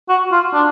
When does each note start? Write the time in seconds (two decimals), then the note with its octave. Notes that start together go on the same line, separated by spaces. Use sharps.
0.09 F#4
0.32 F4
0.54 D4